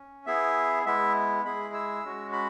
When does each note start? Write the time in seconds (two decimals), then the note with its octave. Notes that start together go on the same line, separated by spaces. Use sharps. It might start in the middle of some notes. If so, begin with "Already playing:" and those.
Already playing: C#4
0.26 B3 E4 G#4 E5
0.86 G#3 B3 E4 E5
1.44 G#3 E4 G#4 B5
1.74 E6
2.04 G#3 C#4 F#4
2.33 B5